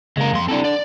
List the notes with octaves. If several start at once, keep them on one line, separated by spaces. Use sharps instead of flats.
C#3 G#3 A#3 A#4
F2 C6
C4 D4 E4 A4
D5